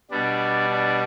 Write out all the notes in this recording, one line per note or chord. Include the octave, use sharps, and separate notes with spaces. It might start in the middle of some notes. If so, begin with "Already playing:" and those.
B2 G3 B3 D4
D4